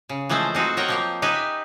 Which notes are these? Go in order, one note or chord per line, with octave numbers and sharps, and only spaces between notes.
C#3
E3 F3 G#3 A3 C5
C4 D#4 F#4 A4
F#3 D#4 A#4 F#5 G5
F3 A#3 A#4
D#4 G4 B4 E5 G#5